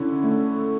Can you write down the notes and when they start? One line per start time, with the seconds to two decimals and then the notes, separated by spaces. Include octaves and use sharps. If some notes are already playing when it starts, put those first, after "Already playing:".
Already playing: D3 C#4 E4
0.24 A3